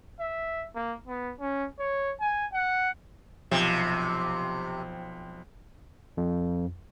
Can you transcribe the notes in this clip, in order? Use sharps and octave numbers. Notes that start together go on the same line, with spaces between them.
E5
A#3
B3
C#4
C#5
G#5
F#5
B1 C3 F3
F2